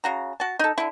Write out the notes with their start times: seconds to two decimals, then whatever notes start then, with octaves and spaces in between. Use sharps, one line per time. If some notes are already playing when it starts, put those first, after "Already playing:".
0.04 C#3 F#4 A#5
0.40 F#4 A5
0.59 D#4 A4
0.78 D3 E4